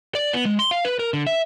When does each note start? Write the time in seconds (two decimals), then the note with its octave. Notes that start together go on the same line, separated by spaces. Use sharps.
0.15 D5
0.33 B3
0.45 G#3
0.59 C6
0.71 F5
0.85 B4
0.99 A#4
1.13 D3
1.27 E5